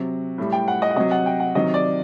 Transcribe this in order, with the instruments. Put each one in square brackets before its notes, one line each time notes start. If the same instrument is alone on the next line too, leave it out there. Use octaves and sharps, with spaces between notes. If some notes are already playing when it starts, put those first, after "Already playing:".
Already playing: [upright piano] C3 F#3
A2 G3
G5
F#5
D#5
F#5
C3 F#3 D#5
F#5
G5
F#5
C3 D#3 F#3 D#5
D5